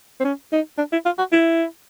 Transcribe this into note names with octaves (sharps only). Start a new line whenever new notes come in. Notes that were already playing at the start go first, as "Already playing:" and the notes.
C4
C#4
D#4
D4
E4
F4
F#4
E4